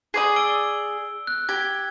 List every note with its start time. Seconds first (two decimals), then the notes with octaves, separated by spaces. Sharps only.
0.14 G#4 D5 D#6
0.36 E6 D7 G7
1.27 F#6
1.49 G4 G#6